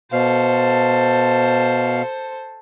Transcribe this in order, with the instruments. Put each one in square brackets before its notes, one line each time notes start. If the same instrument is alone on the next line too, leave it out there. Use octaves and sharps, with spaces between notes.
[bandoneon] B2 F5 [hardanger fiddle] A4 C5